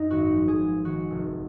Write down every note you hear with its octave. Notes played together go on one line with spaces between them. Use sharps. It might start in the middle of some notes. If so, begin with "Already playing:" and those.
Already playing: F#2 D#4
G#1 F#4
F3
G#4
G#3
D#3 F#4
F1